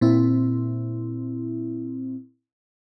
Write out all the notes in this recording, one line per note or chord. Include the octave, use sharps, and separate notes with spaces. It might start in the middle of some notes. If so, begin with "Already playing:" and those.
A#2 C4 E4